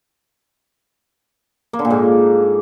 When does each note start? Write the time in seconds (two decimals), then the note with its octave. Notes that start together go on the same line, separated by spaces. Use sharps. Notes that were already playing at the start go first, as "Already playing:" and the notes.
1.73 A#3
1.79 D3
1.85 A#2
1.90 G#2